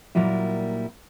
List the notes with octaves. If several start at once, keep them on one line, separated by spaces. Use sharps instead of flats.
A#2 F#3 G3 A#3 E4